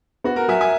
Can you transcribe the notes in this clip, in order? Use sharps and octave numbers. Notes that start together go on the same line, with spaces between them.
B3 F#4
F#4 A#4
F#3 E5 G#5
E5 G#5